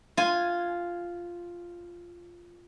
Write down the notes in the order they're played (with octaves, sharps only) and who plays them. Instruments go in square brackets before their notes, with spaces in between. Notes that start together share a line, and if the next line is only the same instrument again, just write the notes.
[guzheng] F4 G#5